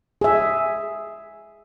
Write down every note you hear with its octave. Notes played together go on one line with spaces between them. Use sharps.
G#4 E5